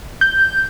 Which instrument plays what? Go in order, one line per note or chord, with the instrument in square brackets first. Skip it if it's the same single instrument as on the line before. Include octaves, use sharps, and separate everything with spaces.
[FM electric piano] G6